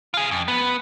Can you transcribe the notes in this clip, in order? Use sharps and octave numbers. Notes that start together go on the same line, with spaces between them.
F4 G#4
F2
B3